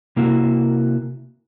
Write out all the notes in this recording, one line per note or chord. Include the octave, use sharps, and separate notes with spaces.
C3 A#3 E4 F#4